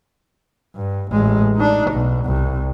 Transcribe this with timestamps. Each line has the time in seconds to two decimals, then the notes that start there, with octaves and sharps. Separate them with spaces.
0.76 G2
1.12 A1 G#3
1.56 D4 D#4
1.91 B1
2.25 C2